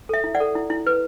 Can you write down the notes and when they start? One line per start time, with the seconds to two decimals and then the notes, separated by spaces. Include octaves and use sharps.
0.09 A4 E5
0.24 E4
0.35 D5 F#5
0.40 A4
0.55 E4
0.70 E4
0.87 B4